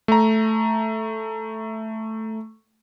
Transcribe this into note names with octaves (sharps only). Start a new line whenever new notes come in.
A3 A#5